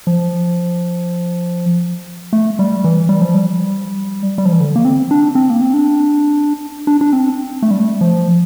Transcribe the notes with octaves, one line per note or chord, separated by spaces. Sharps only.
F3
A3
G3
E3
G3
F3
G3
G3
F3
E3
D3
A#3
C4
D4
C4
A#3
C4
D4
D4
D4
C4
A3
G3
A3
F3